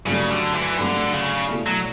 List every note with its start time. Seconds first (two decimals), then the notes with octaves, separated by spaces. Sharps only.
0.06 G2 C#3 F#3 A3
0.30 D3
0.53 E3
0.77 G2 D3 F#3 A3
1.13 C#3
1.49 B2 A3 E4
1.66 F#3